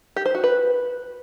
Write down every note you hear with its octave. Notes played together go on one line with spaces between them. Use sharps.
G4
C5
F#4
B4